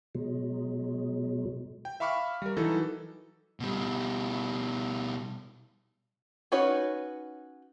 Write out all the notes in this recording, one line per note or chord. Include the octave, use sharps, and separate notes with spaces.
B2 F#3 G#3
G5
E5 F5 B5 C#6 D6 F6
G3 A#4
E3 F#3 D#4 A4 B5
B2 G3
C#4 D#4 F#4 B4 C#5